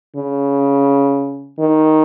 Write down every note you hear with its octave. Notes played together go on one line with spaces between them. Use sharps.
C#3
D#3